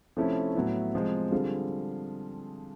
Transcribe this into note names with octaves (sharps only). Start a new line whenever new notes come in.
C3 F3 A3 C#4 E4
A2 F#3 B3 E4
C3 F3 G#3
D3 G3 C4 F4 G#4